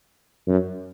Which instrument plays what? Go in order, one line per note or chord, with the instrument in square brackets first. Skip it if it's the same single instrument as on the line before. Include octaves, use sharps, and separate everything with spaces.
[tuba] F#2